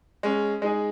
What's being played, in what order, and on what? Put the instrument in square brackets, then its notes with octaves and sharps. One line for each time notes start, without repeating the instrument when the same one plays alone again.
[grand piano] G#3 C#4
G#3 D#4 G#4